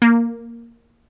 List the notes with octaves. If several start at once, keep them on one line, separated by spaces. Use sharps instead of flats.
A#3